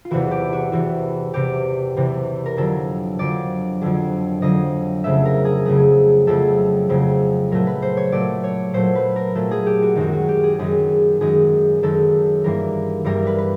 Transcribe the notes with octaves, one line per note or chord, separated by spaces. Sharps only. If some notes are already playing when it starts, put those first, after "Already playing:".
F4
E2 C3 E3 F#4
G4
F#4
E2 C3 E3 F#4
E2 C3 E3 G4
E2 C3 E3
A#4
F2 D3 F#3 A4
F2 D3 F#3 D5
F2 D3 F#3
F2 D3 F#3 D#5
F2 C#3 F#3 A3 E5
A#4
G#4
F2 C#3 F#3 A3 G#4
F2 C#3 F#3 A3 A4
F2 C#3 F#3 A3
A#2 F#3 A3 A#4
B4
C5
C#5
A#2 F#3 A3 D5
C#5
A#2 F#3 A3 C5
B4
A#4
A#2 F#3 A3 A4
G#4
G4
F#4
F#2 D#3 G#3 F#4
F#4
G4
G#4
F#2 D#3 G#3 G#4
F#2 D#3 G#3 G#4
F#2 D#3 G#3 A4
G2 E3 G3 A#3 A#4
G2 E3 G3 A#3 A#4
B4
B4